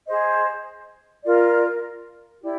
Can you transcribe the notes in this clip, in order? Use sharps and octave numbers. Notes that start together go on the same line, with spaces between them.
G#4 C5 D#5
F4 A#4 D5
E4 G4 D5